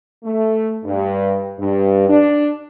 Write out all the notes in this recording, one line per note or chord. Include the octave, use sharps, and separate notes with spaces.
A3
G2
G2
D4